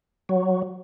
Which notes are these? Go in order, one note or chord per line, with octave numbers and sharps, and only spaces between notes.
F#3